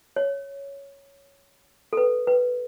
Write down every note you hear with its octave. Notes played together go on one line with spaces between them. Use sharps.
C#5
A4
B4
B4